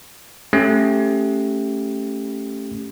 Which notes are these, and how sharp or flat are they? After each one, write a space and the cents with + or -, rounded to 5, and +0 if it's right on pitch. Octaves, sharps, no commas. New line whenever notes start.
A3 +0 C#4 -15 G4 +5